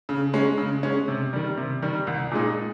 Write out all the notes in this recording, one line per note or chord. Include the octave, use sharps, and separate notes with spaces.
C#3
G#3 C#4
C#3
G#3 C#4
C3
D#3 G3
C3
D#3 G3
C2
A#2 G#3 D#4